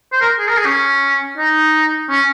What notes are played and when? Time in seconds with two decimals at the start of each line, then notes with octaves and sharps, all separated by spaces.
0.12 C5
0.21 A#4
0.39 G#4
0.48 A#4
0.57 G#4
0.65 C#4
1.37 D#4
2.10 C#4